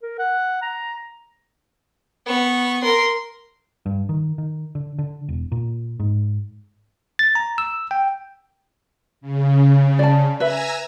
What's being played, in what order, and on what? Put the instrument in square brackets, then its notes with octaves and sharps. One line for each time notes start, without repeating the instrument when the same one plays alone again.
[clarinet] A#4
F#5
A#5
[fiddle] B3 C#6
A#4 C6
[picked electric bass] G2
D#3
D#3
D3
D3
E1
A#2
G#2
[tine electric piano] A6
A#5
E6
G5
[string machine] C#3
[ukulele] D5 A5
[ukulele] B4 E5 [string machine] G#5 A#5 E6